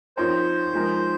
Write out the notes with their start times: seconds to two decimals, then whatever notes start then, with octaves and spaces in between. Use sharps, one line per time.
0.17 F3 C4 D#4 A#4 C5 C#5
0.73 F3 G#3 D#4 A#4